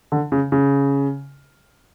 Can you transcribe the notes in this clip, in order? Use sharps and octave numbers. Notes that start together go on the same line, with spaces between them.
D3
C#3
C#3